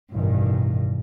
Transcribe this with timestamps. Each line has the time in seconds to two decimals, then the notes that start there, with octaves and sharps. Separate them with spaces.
0.11 A1 G2 B2 D#3